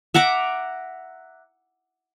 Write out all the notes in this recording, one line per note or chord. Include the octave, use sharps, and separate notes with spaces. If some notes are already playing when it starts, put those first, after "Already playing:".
E5 F#5 A#5 D6